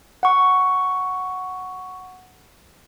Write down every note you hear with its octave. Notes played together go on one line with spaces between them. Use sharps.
F#5 C#6